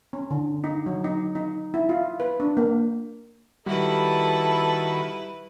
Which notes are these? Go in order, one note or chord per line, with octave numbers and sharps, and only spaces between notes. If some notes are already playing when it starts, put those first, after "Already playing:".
C#4
D3
D#4
F#3
D#4
D#4
E4
F4
B4
D4
A#3
D#3 G3 E4 F#4 A4 B4 B5